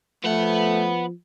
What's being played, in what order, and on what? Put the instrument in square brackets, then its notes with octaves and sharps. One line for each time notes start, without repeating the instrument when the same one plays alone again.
[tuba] F3 [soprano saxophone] A3 [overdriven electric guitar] B3 F#5